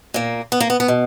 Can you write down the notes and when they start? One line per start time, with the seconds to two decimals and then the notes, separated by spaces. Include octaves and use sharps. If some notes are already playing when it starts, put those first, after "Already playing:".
0.14 A#2 A#3
0.52 B3
0.60 A#3
0.70 B3
0.80 B3
0.88 B2